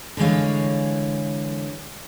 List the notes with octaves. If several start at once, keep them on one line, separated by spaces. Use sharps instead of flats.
D3 E3 G#3 C#5 F5